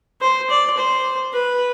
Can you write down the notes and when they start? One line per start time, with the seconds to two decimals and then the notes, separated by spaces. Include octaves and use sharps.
0.21 C5
0.50 D5
0.77 C5
1.33 B4